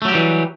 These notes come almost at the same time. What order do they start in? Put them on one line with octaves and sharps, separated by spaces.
A3 F#3 G4 G3 E3